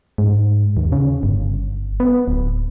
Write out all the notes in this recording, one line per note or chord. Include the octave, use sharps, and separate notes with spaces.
G#2
D#2
C#3
G1
B3
D1